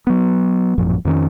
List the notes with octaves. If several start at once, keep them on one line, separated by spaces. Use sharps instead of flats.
F#3 B3
A1 F#2 A#2 F3
F2 D#3 C#4